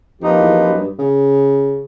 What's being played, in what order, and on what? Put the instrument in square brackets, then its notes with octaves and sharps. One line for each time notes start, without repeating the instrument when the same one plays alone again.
[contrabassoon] F2 [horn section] F3 A#3 D#4 G4 B4
[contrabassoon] E2
F2
F#2
G2
C#3